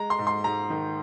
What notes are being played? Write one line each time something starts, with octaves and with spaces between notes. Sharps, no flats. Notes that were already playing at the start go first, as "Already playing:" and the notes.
Already playing: G#3 A#5
C6
G#2
C6
G#2 A#5
D#3